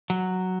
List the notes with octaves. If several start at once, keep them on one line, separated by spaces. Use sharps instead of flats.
F#3